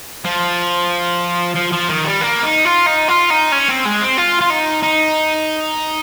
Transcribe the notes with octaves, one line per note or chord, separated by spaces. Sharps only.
F3
F3
F3
D#3
G3
A#3
D#4
F4
D#4
F4
D#4
C#4
C4
G#3
C4
F4
F4
D#4
D#4